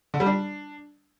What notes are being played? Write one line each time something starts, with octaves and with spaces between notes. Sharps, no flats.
D3
G3
D4